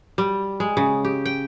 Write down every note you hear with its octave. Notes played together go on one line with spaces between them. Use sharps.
G3
G#3
C#3
G4
G5